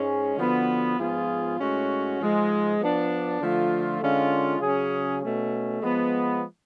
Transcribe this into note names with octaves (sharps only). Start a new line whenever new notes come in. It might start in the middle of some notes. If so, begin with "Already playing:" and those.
Already playing: G#2 G#3 C#4 G#4
D3 F3 B3 F#4
G#2 F3 B3 F4 G#4
A2 G#3 C#4 F#4
G#2 F3 G#3
F3 B3 D4
D3 F3 A3 F4
D3 G#3 C#4 F4
C#3 F#3 C#4 G#4
B2 A3 C#4
F3 G#3 B3